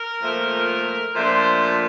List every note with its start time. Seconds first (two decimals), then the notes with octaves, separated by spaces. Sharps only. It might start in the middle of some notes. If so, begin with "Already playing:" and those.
Already playing: A#4
0.21 A#2 F3 A3
1.15 A#2 F3 A3 D4 C5